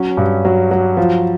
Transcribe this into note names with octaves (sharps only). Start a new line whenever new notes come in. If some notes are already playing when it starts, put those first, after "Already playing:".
Already playing: F#3 C#4
G2
F#3
F#3
F3